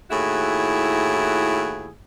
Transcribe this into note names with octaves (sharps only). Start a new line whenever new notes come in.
D#2 A2 E4 F#4 G#4